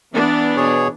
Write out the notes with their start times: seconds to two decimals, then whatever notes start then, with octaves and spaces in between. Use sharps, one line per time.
0.13 E3 B3 D4
0.57 B2 G#4 C#5